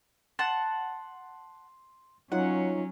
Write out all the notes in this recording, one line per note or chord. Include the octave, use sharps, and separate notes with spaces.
F#5 A5 C6
F#3 C#4 D#4 F4 C#5 F#5